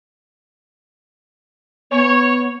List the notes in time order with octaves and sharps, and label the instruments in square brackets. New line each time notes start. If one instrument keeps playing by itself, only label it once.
[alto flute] B3 [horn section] C#5